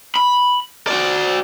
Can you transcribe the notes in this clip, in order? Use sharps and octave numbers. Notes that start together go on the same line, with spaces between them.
B5
F#4 D5